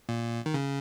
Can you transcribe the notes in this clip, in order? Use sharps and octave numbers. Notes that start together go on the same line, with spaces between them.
A#2
D#3
C#3